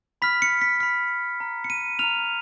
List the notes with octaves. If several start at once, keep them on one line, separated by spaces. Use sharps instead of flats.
B5 F6 B6
C#7
B6
B5 F6 B6
A#5 F6
C#7
D#7
A#5 F6 F7